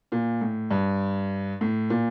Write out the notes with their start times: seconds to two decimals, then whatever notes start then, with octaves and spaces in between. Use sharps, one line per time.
0.12 A#2
0.41 A2
0.71 G2
1.61 A2
1.90 A#2